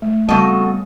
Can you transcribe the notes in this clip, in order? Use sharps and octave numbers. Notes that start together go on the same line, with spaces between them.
A3
C#3 G3 B3 C4 F#4 A4 D#5 A5